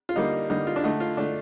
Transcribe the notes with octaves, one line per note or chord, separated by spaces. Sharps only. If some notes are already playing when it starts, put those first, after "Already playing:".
F4
D3 G3 A#3 D#4
D3 G3 A#3 D#4
F4
D4
D3 A3 D#4
F4
D3 A3 D4